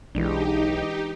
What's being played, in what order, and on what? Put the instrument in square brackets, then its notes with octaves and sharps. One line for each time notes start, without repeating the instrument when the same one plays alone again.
[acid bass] B1 [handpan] E3 G#3 D4 [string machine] D#4 G4